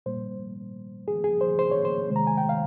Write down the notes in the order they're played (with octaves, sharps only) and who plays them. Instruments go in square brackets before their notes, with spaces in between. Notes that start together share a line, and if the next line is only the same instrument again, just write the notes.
[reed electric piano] A#2 G3 A#3 C5
G#4
G#4
C5
C5
C#5
C5
C3 D#3 G#3
A#5
G#5
G5
F5